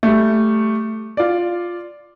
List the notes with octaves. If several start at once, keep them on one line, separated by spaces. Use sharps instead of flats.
G3 A3
F4 D5